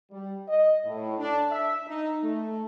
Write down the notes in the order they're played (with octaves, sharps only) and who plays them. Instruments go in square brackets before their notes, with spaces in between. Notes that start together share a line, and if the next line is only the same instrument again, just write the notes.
[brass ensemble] G3
D#5
A2
D4
E5
D#4
A3